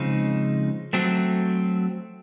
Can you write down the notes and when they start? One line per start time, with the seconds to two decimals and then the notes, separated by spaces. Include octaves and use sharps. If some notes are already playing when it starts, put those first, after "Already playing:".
Already playing: C#3 F3 G#3 C4 D#4
0.93 F#3 A3 C4